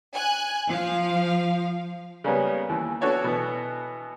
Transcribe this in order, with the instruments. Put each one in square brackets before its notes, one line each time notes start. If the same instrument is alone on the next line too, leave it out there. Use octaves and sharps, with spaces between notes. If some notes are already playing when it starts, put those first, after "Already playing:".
[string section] G#5 F#6
F3 F5
[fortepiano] C#3 G3 G#3 A#3 B3 C#4
D#2 E3
B3 D4 F#4 A4 C#5 D5
B2 E3 B3